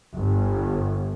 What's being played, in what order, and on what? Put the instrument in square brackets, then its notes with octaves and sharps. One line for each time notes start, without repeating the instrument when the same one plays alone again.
[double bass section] G1